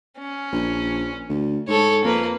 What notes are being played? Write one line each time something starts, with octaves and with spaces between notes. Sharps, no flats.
C#4
A#1
D2
G#2 A4 C#5
F2 A#3 B4